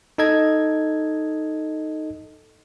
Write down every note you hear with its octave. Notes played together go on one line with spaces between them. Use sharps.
D#4 A4 D#5 G#6